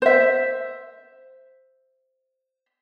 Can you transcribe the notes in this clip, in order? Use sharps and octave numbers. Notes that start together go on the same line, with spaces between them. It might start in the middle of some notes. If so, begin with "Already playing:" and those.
C5 E5